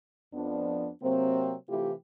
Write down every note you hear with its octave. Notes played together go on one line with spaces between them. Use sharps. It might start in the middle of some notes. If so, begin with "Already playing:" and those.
F2 F3 B3 D4
C3 F#3 A#3 C4
C3 E3 A3 E4 F4 G4